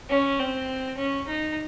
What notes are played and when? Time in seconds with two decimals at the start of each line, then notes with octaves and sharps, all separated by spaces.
0.09 C#4
0.39 C4
0.97 C#4
1.27 D#4